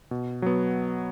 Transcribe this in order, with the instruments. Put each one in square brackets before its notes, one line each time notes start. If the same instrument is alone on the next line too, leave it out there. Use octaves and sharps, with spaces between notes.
[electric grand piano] B2
F#3 B3